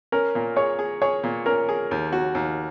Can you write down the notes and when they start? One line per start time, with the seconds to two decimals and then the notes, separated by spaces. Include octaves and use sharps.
0.12 C#4 A#4
0.35 A#2
0.56 G#4 C#5
0.79 G#4
1.02 G#4 C#5
1.23 A#2
1.46 C#4 A#4
1.69 G#4
1.91 D#2
2.13 F#4
2.35 D#2